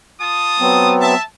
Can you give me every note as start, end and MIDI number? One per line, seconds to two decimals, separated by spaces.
0.20 0.94 65
0.20 0.94 81
0.20 0.94 87
0.60 1.14 54
0.60 1.14 59
0.60 1.14 60
0.99 1.22 76
0.99 1.22 81